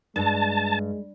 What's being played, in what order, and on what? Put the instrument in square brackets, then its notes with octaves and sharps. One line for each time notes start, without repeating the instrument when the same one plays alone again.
[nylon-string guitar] G2 [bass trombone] G#3 [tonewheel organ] A5